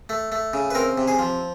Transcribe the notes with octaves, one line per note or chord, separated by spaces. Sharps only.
A3
A3
C#3
B4
C4 A#4
C3
G#4
F3